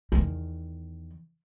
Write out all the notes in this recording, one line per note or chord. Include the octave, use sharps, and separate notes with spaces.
E2 D#3